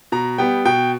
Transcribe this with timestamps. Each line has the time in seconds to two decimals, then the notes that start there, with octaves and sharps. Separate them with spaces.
0.12 B2 A#5
0.38 G3 B3 G5
0.65 B2 G5